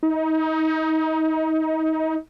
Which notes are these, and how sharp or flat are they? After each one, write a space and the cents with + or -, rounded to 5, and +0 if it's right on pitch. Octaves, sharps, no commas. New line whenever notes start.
D#4 +30